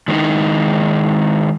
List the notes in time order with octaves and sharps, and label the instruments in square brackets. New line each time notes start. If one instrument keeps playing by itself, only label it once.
[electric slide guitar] D#3 G#3 A3 C4 D#4 E4